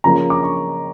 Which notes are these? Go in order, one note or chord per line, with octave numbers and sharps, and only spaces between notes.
C#3 F3 A#3 C#4 A#5
D6
C#6